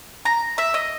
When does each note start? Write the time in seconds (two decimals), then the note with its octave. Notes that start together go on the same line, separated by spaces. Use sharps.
0.25 A#5
0.58 E5
0.74 D#5